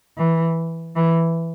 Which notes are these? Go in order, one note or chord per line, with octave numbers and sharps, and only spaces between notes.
E3
E3